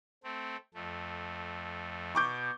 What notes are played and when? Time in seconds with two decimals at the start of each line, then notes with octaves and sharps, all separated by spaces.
0.24 A3 C4
0.74 F2 A3
2.15 B2 C#6 D6 G6